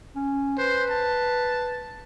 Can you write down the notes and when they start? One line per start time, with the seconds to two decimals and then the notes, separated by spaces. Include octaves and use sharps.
0.15 C#4
0.58 B4 C5
0.90 A5